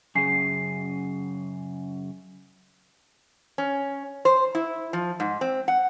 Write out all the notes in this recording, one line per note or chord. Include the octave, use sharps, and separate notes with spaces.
F#2 C#3 G#4 G#5 C7
C#4
C5
E4
F3
G#2
C4
F#5